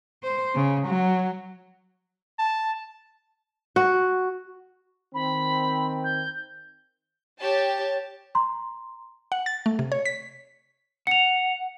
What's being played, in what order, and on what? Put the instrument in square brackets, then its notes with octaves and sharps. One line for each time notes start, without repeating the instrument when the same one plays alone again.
[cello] C5
C#3
F#3
[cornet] A5
[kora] F#4
[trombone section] D#3 C4 [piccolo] B5
[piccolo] G6
[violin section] G4 C#5 A5
[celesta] A#5 C6
[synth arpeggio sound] F#5
A6
A3
C3
C#5
B6
[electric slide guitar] F#5 [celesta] C#7 F7